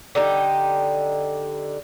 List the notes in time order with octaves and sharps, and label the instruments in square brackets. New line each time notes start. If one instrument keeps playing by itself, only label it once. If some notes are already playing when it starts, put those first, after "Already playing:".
[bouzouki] D3 D#4 G4